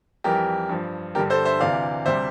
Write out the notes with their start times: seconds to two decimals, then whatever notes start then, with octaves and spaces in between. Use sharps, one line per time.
0.24 F2 E3 G3 G4 A#4
0.69 G2 F3
1.15 G2 D3 G3 G4 A#4
1.30 A4 C5
1.45 C5 E5
1.60 D2 C3 E3 D5 F5
2.06 D2 C3 G3 C5 E5